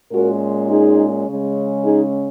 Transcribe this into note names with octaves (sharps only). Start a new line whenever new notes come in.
A#2 G#3 C#4 F#4 A#4
D#4 G#4
C#3 G#3 C#4
D#4 G#4